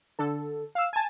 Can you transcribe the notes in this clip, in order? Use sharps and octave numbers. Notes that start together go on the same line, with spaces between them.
D3 A4
F5 E6
G#5 A5